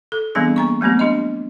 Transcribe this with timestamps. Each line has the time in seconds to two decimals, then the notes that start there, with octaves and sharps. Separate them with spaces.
0.12 A4
0.35 E3 G3 B3 C4 D4 G#4
0.56 A#3 A#5 C#6
0.81 F#3 A3 B3 C4 G4
0.99 D4 G4 D#5